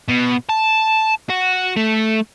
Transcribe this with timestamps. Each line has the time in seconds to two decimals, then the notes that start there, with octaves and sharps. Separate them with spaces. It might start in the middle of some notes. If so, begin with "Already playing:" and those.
0.08 B2
0.49 A5
1.29 F#4
1.76 A3